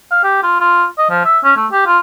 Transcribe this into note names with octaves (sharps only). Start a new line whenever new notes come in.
F5
G4
F4
F4
D#5
F3
E5
C#4
A3
G4
F4